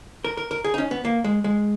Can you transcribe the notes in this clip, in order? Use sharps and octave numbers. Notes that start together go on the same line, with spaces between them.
A#4
A#4
A#4
G#4
D#4
C#4
B3
A#3
G#3
G#3